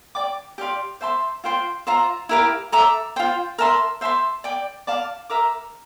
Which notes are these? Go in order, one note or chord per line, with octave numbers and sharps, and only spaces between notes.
D5 G5 D6
G4 D5 F5 C6
C5 E5 A5 C6
F4 C5 G5 C6
F4 C5 E5 A#5
E4 G4 A#4 F5
A4 E5 A#5 D6
F4 C5 G5
A#4 E5 A5 C6
C5 E5 A5 C6
D5 G5 D6
D5 F5 A5
A#4 E5 A#5 D6